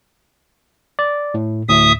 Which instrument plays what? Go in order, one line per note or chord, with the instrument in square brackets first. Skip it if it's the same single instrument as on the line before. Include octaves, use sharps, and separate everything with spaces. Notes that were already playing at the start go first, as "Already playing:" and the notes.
[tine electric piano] D5
A2
[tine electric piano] D2 A2 [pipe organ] E5 D#6